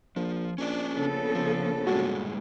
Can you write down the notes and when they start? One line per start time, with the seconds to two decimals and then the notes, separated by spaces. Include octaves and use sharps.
0.16 A#1 F3
0.58 A#1 C#4 D4 D5
0.96 C#3 B3 A4
1.35 F3
1.87 G2 A#2 G#3 F#4